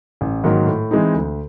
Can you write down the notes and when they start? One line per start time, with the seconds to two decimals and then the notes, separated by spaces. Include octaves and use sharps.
0.21 A1
0.44 G#2 D#3 F#3 A#3
0.67 A2
0.91 E3 G#3 C4 D#4
1.14 D2